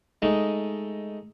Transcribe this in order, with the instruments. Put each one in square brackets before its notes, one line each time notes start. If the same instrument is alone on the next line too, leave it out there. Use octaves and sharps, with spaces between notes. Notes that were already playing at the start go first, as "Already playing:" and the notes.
[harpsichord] G#3 A3 D#4